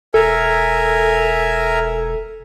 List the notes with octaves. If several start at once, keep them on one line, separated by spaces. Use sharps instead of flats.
E1 A4 A#4 E5 G#5